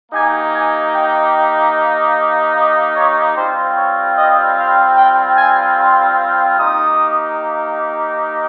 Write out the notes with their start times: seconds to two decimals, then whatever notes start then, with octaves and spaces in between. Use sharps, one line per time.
0.12 A#3 D#4 G4 G#5
0.52 G#5
0.93 G5
2.54 D#5
2.94 C#5
3.35 G3 C4 F4 C5
3.76 C#5
4.15 D#5
4.56 F5
4.96 G5
5.36 G#5
5.77 C6
6.58 A#3 D#4 G4 D#6